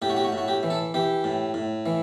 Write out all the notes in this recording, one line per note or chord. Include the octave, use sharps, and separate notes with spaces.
A2 G4
F#4
G4
F#4
A2
F#4
G4
E3
A4
E3 G4
A2
A2
E3